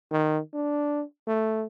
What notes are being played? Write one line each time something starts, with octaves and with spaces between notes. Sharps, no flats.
D#3
D4
A3